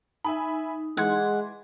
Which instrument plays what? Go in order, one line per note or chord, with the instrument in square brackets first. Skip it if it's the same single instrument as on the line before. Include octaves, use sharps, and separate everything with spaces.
[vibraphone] D#4 [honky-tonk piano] E5 G#5 B5
[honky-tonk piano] E3 C6 G#6 [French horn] G#3 [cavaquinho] F#5